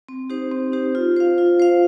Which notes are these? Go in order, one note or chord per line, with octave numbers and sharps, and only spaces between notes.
C4
D#4 G4 C5
C4
D#4 G4 C5
F4
C5 F5
F4
C5 F5